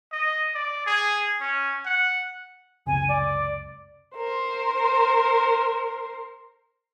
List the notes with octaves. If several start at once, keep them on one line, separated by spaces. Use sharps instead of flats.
D#5
D5
G#4
C#4
F#5
F#1 C#2 C3 G#5
D5
A#4 C5